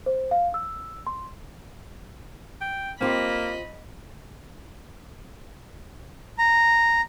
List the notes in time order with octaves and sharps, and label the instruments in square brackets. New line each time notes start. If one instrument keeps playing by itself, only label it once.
[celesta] C5
F5
E6
C6
[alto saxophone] G5
[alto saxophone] A#3 [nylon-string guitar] C4 F4 G4 [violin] D#5 B5
[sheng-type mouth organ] A#5